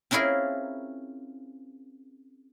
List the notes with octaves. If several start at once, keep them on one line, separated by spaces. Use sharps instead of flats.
C4 C#4 E4 F4 G#4 A#4